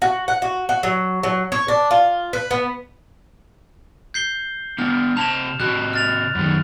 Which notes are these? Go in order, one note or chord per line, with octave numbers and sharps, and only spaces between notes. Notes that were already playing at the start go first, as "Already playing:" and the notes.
F#4
F#5
F#4
F#4
F#3
F#3
C#5
D4
F4
B4
B3
G6 C7 G7
B3 D4 F6
C3 A5 E7 F7
C3 F#4 F#6
F6 A6 F7
F#2 D#3